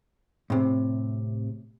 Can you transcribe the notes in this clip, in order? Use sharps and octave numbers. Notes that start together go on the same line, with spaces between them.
A2 C3